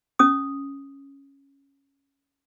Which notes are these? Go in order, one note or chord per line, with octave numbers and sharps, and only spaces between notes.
C#4 D#6